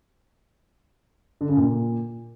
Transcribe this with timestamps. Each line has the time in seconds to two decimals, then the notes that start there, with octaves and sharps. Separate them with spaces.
1.41 D3
1.49 C#3
1.57 A#2